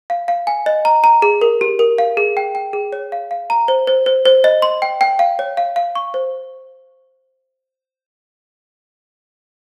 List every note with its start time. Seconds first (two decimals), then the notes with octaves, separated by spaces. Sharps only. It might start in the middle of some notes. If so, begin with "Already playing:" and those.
0.10 F5
0.28 F5
0.47 G#5
0.66 D#5
0.85 A#5
1.04 A#5
1.22 G#4
1.41 A#4
1.61 G4
1.79 A#4
1.98 F5
2.17 G#4
2.37 G5
2.55 G5
2.73 G#4
2.93 C#5
3.12 F5
3.31 F5
3.50 A#5
3.68 C5
3.87 C5
4.06 C5
4.25 C5
4.44 D#5
4.62 C6
4.82 G5
5.01 G5
5.19 F5
5.39 C#5
5.57 F5
5.76 F5
5.95 C#6
6.14 C5